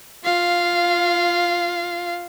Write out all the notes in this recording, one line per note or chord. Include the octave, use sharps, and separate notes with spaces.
F4 F5